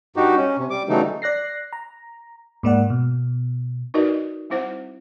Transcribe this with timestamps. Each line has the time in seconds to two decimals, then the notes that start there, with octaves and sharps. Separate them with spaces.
0.16 G2 D#4 F#4 G4
0.37 C#4
0.58 C3
0.70 G3 D6
0.89 C#3 E3 F#3 G3 A3 D#4
1.22 D5 F#6 A#6 C7
1.73 A#5
2.63 G#2 A#3 D5 F#5
2.90 B2
3.94 D#4 F#4 A#4 B4 D5 D#5
4.50 G3 C4 E4 C5 F#5